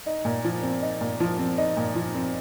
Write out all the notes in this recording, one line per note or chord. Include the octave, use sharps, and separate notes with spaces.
D#4
A#2
F3
C4
D#4
A#2
F3
C4
D#4
A#2
F3
C4